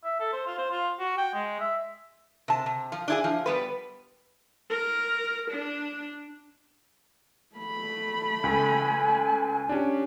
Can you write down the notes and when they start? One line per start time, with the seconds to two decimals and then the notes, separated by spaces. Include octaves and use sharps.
0.04 E5
0.20 A4
0.33 C5
0.46 F4
0.58 C5
0.71 F4
0.99 F#4
1.17 G5
1.34 G#3
1.60 E5
2.48 C3 A5
2.66 C3
2.92 F3
3.08 D4 E4 G#4
3.24 F3
3.46 G3 B3 B4
4.70 A#4
5.50 D4
7.56 A3 B5
8.44 C#2 A4 G#5
9.69 C#4 D4 G4